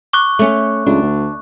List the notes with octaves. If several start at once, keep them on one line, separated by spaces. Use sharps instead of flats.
C#6 D6 F#6
A3 C#4
C#2 D4
D2